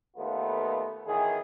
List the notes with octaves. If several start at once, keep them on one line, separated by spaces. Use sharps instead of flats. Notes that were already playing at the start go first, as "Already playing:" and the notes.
D#2 A3 B3 F4 B4
B1 D#3 E3 G#4